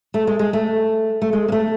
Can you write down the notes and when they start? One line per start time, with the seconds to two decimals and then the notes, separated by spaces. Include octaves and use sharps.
0.14 A3
0.27 G#3
0.39 G#3
0.53 A3
1.22 A3
1.33 G#3
1.48 A#3
1.52 A3